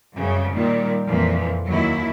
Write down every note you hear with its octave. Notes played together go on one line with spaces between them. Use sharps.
F#2 C#3 G3
A#2 D#3 G3
F2 A#2 E3 F3
D#2 F#3 E4